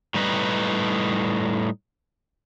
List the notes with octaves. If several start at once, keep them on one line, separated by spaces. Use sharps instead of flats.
A2 G3 D#4 B4